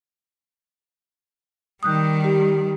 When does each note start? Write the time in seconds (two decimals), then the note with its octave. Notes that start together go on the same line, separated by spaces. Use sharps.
1.83 D#3 G3 D#6 F#6 G6
2.24 G4